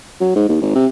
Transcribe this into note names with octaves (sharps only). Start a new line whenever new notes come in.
F#3
G#2
D#2
G#1
C3